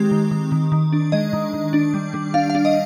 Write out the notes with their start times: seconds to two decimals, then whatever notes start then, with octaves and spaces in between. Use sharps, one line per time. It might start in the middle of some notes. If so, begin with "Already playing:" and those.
Already playing: D#3 G#3 C4 G4
0.11 D#3
0.31 D#3
0.52 D#3
0.72 D#3
0.92 D4
1.12 G#3 D#5
1.33 D#3
1.54 D#3
1.73 D4
1.94 G3
2.14 G3
2.34 D4 F5
2.50 F5
2.55 D4
2.65 D#5